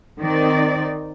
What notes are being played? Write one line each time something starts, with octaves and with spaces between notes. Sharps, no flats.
D#3 C4 D#4 D5